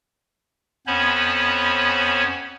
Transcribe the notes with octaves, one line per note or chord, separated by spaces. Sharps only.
F2 B3 C#4 C5 C#5 B5